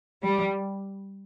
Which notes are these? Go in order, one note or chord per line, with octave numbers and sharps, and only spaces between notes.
G3